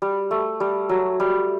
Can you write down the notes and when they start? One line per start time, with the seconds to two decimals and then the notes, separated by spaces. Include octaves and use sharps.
0.02 G3
0.31 A3
0.60 G3
0.89 F#3
1.20 G3